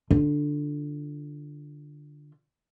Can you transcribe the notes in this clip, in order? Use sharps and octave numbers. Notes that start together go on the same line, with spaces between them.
D3 F4